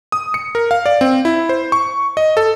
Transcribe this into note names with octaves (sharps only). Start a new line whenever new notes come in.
D#6
C#7
A#4
F5
D5
C4
E4
C5
C#6
D#5
A4